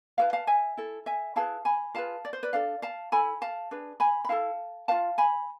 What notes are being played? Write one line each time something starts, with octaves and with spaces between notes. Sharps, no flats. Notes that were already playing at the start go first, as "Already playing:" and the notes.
E4 G#4 B4 F5 A5
F5 A5
E5 G#5
E4 A4
E5 G#5
E4 G#4 B4 F5 A5
G#5 B5
F4 G#4 B4 F5 A5
D5
C5
B4 D5
D4 A4 D5 F5
F5 A5
E4 A4 G#5 B5
F5 A5
D4 G#4 B4
G#5 B5
B5
E4 A4 F5 A5
F4 B4 F5 A5
G#5 B5